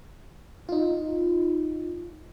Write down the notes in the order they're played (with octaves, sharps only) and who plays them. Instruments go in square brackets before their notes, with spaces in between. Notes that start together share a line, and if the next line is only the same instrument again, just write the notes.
[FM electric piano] D#4 F4